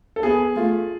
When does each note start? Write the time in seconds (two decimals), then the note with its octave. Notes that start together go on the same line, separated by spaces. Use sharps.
0.16 A4
0.23 B3 G#4
0.56 A3 F4